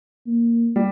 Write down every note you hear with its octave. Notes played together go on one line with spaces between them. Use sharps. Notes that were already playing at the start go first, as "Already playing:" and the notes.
A#3
G3